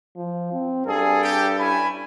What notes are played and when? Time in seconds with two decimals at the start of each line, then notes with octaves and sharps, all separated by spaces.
0.16 F3
0.52 C4
0.87 G2 G#4 A4
1.22 G4 G5
1.59 C#4 E4 G#5 B5